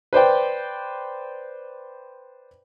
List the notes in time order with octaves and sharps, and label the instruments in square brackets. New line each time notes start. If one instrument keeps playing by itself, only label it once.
[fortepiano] B4 C5 D5 G5